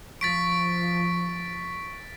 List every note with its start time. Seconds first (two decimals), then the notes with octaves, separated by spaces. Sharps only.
0.21 F3 C#6 A6 B6 D7